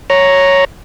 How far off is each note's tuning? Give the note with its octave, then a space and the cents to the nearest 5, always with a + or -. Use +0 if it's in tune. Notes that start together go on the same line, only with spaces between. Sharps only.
C#5 +0 A#5 +0